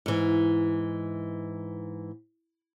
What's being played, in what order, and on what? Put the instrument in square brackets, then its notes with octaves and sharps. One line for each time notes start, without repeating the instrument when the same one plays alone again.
[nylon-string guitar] G#2 E3